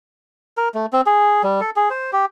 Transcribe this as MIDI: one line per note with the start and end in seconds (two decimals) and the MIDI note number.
0.57 0.69 70
0.74 0.86 57
0.93 1.01 60
1.06 1.42 68
1.43 1.61 55
1.61 1.70 69
1.76 1.89 68
1.90 2.11 72
2.13 2.25 67